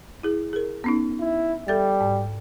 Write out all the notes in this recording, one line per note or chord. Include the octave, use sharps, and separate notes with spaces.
E4 G#4
G#4 A#4
B3 C#4 D#4
E4
G3 A4 E5 A6
G#2